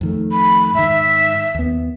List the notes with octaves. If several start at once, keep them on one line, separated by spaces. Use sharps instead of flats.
F2 D#3 A3
B5
G#2 D#3 E5
D#2 B3